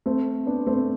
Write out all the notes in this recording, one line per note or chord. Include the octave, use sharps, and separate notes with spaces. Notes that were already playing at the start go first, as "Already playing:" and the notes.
A3 C4
B3 D4
A3 C4